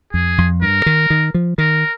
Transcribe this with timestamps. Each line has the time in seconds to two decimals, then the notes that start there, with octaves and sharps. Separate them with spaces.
0.13 F2 G#4
0.38 F2
0.62 G2 A#4
0.86 D#3
1.10 D#3
1.34 F3
1.58 D#3 A#4